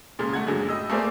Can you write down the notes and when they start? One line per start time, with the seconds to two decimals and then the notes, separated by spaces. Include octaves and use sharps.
0.19 E1 A#2 C#3 G#3 C6
0.33 A3 F#5 G#6
0.47 F#2 A#2 D3 F#3 G#3
0.69 A2 D#5 E6
0.90 A3 A#3 G#4 A#4 C5 D5